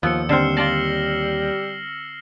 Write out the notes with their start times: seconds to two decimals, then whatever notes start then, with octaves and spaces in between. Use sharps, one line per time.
0.03 D#2 F3 B3 E6 C#7
0.29 D3 G3 C4 F6 C7 E7
0.57 F4 D5 A5 A#6 F#7 G7